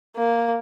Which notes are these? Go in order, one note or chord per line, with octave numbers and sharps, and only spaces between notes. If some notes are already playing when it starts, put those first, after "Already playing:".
A#3